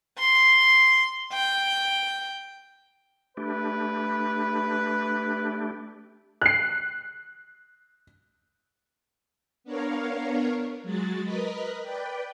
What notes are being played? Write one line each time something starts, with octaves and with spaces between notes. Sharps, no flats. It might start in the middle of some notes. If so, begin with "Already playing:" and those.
C6
G5
A3 D4 G4 B4
F#6 C7
B3 D4 A#4 C#5 F5
F#3 G#3 F#4 A6
A#4 B4 D#5 B5
B4 D5 G5